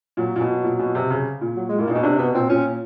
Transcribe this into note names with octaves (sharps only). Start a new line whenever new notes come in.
A#2 F#3
A#2
B2
A#2
B2
C3
C#3
A#2
F#3
G#3
A2 A#3
A#2
D#4
B2
C3 D4
B2 B3
A#2 C4
A#2 C#4